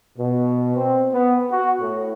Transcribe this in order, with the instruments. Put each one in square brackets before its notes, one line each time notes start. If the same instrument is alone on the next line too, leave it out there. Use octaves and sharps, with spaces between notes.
[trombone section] B2
C4
B3
F#4
A2